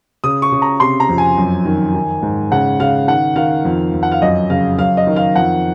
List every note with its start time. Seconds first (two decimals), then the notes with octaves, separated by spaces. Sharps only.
0.24 C#3 D#6
0.42 C#6
0.52 C#3
0.62 A#5
0.80 C3 C6
1.00 A#5
1.09 F2
1.18 G#5
1.37 F#2
1.65 D#3
1.94 D#3
2.22 G#2
2.52 C#3 F#5
2.80 C#3 F5
3.08 D#3 F#5
3.36 D#3 F5
3.65 F2
3.94 F2
4.03 F#5
4.12 F5
4.22 F#2 D#5
4.50 C#3 F5
4.79 F#2 F5
4.97 D#5
5.07 D#3
5.16 F5
5.36 F2 F#5